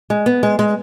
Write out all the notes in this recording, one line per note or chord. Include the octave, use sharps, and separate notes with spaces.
G#3
B3
G#3
G#3